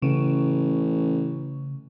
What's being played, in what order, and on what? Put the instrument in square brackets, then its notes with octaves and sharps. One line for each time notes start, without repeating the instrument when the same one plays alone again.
[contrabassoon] A1 [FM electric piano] C#3